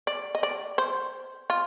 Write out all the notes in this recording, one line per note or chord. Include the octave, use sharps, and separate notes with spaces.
D5
D#5
D5
C5
F4